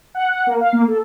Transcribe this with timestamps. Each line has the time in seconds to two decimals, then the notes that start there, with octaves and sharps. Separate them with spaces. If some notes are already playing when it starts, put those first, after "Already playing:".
0.15 F#5
0.30 F#5
0.47 A#3
0.60 F5
0.73 A#3
0.88 A4